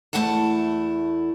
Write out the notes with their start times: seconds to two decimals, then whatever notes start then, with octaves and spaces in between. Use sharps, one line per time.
0.13 E2 G#2 A3 E4 F#5 A5